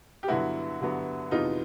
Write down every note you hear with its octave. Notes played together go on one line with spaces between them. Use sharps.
G4
G2 D3 F#3 B3 E4 F#4
G2 D3 F#3 B3
F2 C3 E3 G#3 B3 D#4 F4